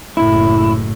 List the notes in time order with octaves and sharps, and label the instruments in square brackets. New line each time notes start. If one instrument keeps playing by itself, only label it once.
[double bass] F#1 A2 [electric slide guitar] E4